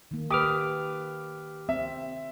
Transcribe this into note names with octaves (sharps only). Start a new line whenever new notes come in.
D#3 A#3
G4 B4 D6 D#6 F6
C4 E5